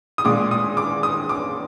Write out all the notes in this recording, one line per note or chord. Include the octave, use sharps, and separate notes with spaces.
D#6
A#2 G#3 D6
D#6
D6
D#6
D6